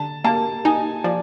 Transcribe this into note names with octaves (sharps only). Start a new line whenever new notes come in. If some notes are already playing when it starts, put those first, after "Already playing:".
Already playing: D3 A5
A#3 A5
D#4 G#5
F3 D5